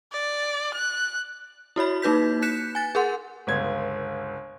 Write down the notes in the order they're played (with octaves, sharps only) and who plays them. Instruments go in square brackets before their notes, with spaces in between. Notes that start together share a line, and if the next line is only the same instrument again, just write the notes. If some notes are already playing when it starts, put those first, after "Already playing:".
[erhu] D5
F#6
[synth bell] E4 F#4 C#5 B5
A#3 D#4 B4 G6 B6
F#6 G6 B6 C#7 E7
G#5 A6
G#4 A#4 F#5 C6
[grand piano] G1 C#2 G#6